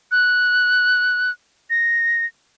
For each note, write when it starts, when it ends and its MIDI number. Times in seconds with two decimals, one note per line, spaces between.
0.12 1.31 90
1.70 2.26 94